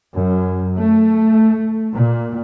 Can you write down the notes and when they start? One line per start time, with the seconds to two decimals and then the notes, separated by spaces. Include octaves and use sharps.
0.16 F#2
0.79 A3
1.93 A#2